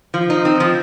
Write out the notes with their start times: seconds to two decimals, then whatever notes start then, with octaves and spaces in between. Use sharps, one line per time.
0.14 F3
0.30 D#4
0.45 C4
0.60 F3